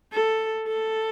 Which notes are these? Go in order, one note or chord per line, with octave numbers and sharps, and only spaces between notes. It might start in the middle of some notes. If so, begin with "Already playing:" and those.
A4
A4